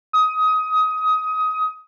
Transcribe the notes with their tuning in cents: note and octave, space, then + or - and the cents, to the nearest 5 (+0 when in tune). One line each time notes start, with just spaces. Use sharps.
D#6 +20